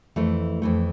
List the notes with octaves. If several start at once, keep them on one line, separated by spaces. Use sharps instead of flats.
F2 E3 A3
F2 E3 A3